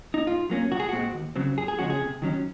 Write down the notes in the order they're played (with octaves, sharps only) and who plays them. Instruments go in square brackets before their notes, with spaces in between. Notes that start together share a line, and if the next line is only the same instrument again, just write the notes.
[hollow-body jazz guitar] D#4
G#2 F4
F#3 A#3 C#4
C2 F#4
G#4
A#2 G#3 C4 F#4
D#2
C#3 F#3 C4
F#2 G#4
G#4
C#3 F3 G#3 C#4 F#4
G#4
C3
D#3 F#3 C#4